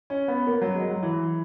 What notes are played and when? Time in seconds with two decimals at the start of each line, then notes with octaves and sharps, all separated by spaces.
0.10 C#4
0.28 B3
0.47 A#3
0.61 F#3
0.75 G#3
0.89 F#3
1.02 E3